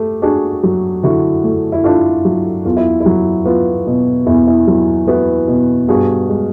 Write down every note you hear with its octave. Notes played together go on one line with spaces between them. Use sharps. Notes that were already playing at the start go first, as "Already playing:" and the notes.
Already playing: A3 G4
D4 F#4 G#4
F#3
D3 E4 F#4
A3
E4
D4 F4
F#3
E2 F4
E4
E4
F#3
B3 F4
B2
E2 E4
E4
F#3
B3 E4 F#4
B2
G2 F#4 G#4
G#3